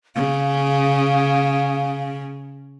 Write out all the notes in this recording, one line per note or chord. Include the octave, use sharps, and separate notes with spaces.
C#3 F5